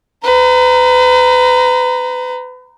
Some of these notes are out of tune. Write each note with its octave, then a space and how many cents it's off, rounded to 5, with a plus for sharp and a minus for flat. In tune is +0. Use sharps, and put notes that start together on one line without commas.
B4 +35 A#5 +0